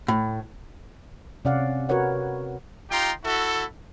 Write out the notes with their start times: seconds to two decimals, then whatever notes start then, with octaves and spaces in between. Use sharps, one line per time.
0.08 A2
1.45 C3 C#4 D5 F5 F#5
1.89 F#4 A#4 B4 C#5 F#5
2.90 D#4 F4 G4 G5 A#5 C6
3.25 E4 F#4 A4